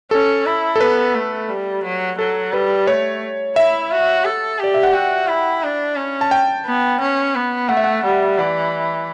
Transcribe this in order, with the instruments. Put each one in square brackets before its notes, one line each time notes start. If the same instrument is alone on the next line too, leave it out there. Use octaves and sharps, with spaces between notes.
[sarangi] C#4 [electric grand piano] A4
[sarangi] E4
[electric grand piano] A4
[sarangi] B3 [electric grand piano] B4
[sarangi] A3
G3
F#3
[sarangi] F#3 [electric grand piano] A4
[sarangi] G3 [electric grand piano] B4
[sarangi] A3 [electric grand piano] C#5
[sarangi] E4 [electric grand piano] E5
[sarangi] F#4
A4
[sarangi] G4 [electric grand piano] D5
[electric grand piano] E5
F#5
[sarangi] F#4 [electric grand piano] G5
[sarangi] E4
D4
C#4
[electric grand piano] A5
G5
[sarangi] B3
C#4
B3
[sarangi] A3 [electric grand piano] F#5
[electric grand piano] E5
F#5
[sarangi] G3
[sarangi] E3 [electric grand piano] D5